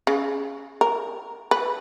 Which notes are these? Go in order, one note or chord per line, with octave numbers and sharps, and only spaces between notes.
C#3
A#4
B4